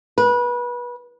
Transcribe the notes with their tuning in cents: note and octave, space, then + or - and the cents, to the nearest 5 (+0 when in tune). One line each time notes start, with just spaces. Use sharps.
B4 -25